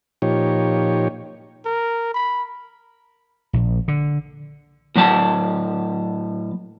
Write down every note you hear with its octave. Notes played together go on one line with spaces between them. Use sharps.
A#2 F3 D#4 G4 C#5
A#4
B5
A#1
D3
A2 F#3 A5